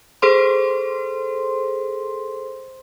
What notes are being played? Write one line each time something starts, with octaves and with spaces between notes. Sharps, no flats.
G#4 A4 C5 C6